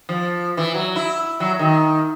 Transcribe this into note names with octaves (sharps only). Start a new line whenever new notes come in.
F3
E3
F#3
E4
F#3
D#3